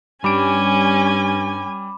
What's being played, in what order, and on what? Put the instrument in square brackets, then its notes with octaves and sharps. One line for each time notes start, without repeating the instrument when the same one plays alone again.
[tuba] G2 [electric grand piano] G3 D7 [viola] C#4 G#5 [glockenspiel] B5 D6 E7